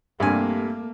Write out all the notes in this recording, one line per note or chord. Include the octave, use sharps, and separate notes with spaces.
G2 C3 A3 A#3 G#5